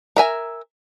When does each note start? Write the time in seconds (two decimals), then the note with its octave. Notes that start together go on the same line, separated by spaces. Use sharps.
0.17 A#4 E5 G#5 A#5